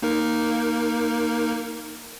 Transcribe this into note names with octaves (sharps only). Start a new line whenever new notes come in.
A#3 D#4 A#4